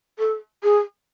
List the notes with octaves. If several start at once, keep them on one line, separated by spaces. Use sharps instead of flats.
A4
G#4